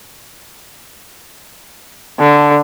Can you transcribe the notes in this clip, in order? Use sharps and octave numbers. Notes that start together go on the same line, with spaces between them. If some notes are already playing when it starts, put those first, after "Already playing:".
D3